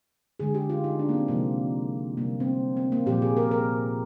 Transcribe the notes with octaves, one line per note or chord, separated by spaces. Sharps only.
D3 G#3 G#4
G4
F4
D#4
D4
A#3
C4
C3 F3 G#3 A#3
C3 G3 A#3
C4
C4
A#3
A#2 F3 A#3 G4
G#4
A#4
A#4